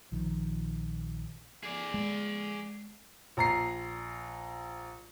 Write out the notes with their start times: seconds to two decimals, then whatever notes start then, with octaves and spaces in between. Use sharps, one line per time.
0.12 A#1 D#3 F3
1.63 G#4 D5
1.94 G#3
3.37 A#1 A#5 C7